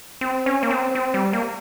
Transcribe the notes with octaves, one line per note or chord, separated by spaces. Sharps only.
C4
C#4
A#3
C4
C4
G3
A#3